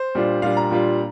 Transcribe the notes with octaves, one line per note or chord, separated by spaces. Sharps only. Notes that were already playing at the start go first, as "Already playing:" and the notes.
Already playing: C5
A#2 G3 D4 F4
A#2 G3 D4 F4 F5
A#5
A#2 G3 D4 F4